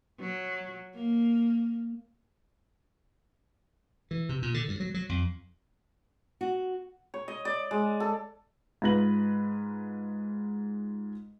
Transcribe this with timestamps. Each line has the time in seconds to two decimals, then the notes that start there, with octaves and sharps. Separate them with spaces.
0.19 F#3
0.95 A#3
4.11 E3
4.29 C3
4.42 A#2
4.54 D3
4.68 G2
4.80 F#3
4.94 F#3
5.09 F2
6.41 F#4
7.14 C#5
7.28 D#5
7.45 D5
7.71 G#3
8.00 A4
8.82 G#2 F4 B4 A#6 F#7